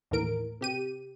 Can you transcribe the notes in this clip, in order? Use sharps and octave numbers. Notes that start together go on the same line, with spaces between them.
D#2 A2 E3 A#4 D7
C3 G4 D#7